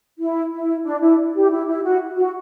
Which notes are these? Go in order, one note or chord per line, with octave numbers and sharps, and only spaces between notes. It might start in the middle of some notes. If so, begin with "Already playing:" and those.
E4
E4
D4
E4
G4
E4
E4
F#4
F#4